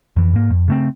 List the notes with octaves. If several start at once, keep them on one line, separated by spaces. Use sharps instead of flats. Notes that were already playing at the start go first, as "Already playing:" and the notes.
F2 E3
G#2 A#3
F2
C#3 A3 C4